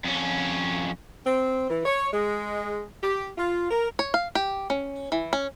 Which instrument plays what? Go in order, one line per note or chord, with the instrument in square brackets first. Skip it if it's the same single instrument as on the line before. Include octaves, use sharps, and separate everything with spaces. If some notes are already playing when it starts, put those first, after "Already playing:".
[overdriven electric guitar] F2 C#4
[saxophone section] C4
E3
C#5
G#3
G4
F4
A#4
[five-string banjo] C#5
F5
G4
C#4
E3
C#4